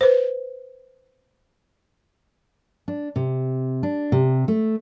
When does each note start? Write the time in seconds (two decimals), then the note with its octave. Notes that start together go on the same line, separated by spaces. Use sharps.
0.01 B4 C5
2.88 D4
3.16 C3
3.83 D4
4.12 C3
4.48 A3